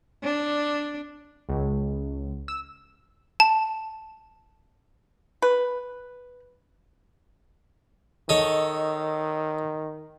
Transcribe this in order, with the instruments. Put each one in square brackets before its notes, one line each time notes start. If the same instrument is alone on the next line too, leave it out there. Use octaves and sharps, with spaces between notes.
[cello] D4
[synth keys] C#2
E6
[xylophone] A5
[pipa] B4
[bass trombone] D#3 [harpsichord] A4 C#5 D#5